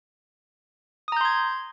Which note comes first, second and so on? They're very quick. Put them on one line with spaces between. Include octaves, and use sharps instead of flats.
D#6 A#5 G6 C6 G#6